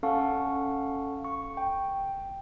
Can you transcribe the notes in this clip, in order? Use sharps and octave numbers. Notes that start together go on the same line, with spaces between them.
C#4 A4 F5 F#5 A5 C#6
C#6
G5